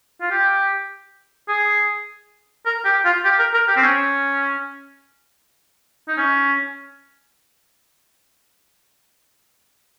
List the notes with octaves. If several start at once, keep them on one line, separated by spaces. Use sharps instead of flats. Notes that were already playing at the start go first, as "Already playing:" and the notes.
F4
G4
G#4
A#4
G4
F4
G4
A#4
A#4
G4
C4
C#4
D#4
C#4